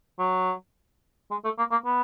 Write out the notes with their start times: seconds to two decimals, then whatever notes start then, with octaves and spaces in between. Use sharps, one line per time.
0.19 F#3
1.31 G#3
1.44 A3
1.58 A#3
1.71 A#3
1.85 B3